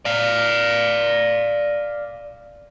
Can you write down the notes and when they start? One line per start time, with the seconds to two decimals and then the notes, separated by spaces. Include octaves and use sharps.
0.05 D5 F5